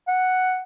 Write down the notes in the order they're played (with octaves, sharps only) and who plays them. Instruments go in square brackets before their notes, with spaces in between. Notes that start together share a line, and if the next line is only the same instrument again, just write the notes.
[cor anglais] F#5